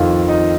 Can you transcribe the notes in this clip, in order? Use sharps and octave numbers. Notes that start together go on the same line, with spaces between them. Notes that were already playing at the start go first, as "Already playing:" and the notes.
Already playing: F2 D#3 F4
D#4